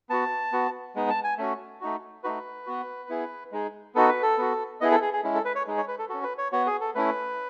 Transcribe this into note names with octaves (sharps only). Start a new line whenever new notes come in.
B3 F#4 A5
B3 F#4
G#3 B3 D#4
A5
G#5
A3 C#4 F#4
A3 D#4 F#4
A3 D#4 F#4 B4
B3 F#4
B3 E4 G#4
G#3 D#4 G#4
B3 D#4 F#4 A4
B4
A4
B3 F#4
B3 E4 G#4 D#5
A4
G#4
G#4
G#3 C#4 E4
A4
B4
C#5
G#3 D#4 G#4
C#5
B4
A4
C#4 F#4 A4
B4
C#5
B3 F#4 C#5
G#4
A4
A3 C#4 E4 B4